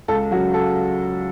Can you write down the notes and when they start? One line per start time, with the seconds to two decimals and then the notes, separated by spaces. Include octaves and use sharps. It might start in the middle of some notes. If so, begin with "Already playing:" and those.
0.08 C#2 A4
0.31 F#3 F#4
0.35 C#3
0.54 A4